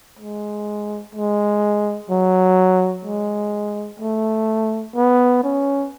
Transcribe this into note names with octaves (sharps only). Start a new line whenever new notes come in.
G#3
G#3
F#3
G#3
A3
B3
C#4